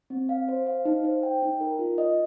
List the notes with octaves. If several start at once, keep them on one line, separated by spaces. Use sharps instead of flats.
C4
F5
C5
F5
D#4
C5
G5
D#4
A#4
F4
D#5